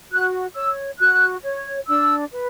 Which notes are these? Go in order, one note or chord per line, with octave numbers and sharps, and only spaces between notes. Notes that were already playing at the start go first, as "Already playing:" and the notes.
F#4 F#6
C#5 E6
F#4 F#6
C#5
D4 E6
B4